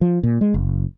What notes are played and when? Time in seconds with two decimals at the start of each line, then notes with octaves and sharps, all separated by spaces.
0.01 F3
0.23 A#2
0.41 G#3
0.54 F#1